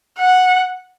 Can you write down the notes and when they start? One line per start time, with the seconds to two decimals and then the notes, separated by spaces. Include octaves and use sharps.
0.19 F#5